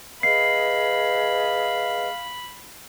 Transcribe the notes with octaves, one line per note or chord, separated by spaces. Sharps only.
G#4 B4 D#5 F5 B5 C7